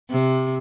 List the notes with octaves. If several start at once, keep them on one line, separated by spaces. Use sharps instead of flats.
C3